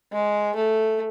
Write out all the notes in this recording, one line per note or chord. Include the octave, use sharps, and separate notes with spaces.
G#3
A3